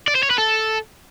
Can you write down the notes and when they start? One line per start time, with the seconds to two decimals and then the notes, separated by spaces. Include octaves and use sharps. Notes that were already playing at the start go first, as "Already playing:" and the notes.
0.08 D5
0.15 C5
0.23 C#5
0.31 B4
0.38 A4